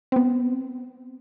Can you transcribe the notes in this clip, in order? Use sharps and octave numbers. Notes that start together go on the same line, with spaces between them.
B3 C4